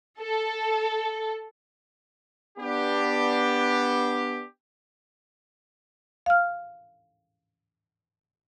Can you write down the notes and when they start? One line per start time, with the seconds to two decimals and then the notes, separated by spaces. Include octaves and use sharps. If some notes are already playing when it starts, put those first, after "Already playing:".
0.19 A4
2.59 B3 D4 G4
6.26 F5 F6